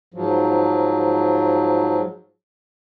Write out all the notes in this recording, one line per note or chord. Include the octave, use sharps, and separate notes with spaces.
G#2 F3 F#3